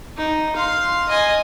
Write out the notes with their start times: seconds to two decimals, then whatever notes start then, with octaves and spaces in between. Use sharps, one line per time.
0.17 D#4
0.56 F5 C6
1.09 D#5 G#5